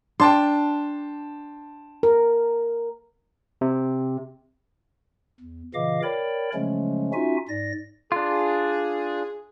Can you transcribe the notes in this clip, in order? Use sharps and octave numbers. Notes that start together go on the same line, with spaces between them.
D4 G5 A5 C6
A#4
C3
E2
A#2 C#3 E3 D#5 F5 D6
A#4 C#5 D5 G5 B5
C#3 F3 F#3 G#3 A3 C#4
C#4 D#4 F4 F#4 E5 G#5
G#2 D5 A#6
D4 F4 G#4